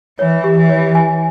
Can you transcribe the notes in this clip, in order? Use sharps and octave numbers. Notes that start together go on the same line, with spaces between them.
E3 C#5
G4
E3
C#5
G#5